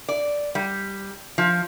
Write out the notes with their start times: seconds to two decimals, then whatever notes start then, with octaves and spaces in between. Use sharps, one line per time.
0.09 D5
0.55 G3
1.38 F3